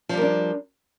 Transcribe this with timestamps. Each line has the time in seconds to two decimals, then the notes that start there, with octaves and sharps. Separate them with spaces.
0.09 F3
0.13 G3
0.17 A#4
0.21 D4